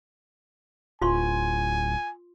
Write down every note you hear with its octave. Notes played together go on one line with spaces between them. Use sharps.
D1 F4 G#5 C6 C#6